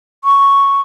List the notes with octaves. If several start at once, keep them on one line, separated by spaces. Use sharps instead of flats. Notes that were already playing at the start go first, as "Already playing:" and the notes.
C#6